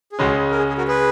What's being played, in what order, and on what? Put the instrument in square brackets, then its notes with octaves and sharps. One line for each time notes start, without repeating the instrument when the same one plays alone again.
[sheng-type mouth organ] G#4
[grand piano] C#2 C#3 G#3 C#4 [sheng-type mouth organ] F#4
[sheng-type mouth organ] A#4
G#4
G#4
F#4 A#4
G#4 B4